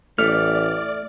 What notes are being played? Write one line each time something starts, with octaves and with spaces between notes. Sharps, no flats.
A1 A3 D5 F6